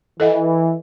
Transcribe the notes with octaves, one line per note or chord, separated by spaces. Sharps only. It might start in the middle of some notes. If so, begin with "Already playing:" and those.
E3 A4 D#5 F#5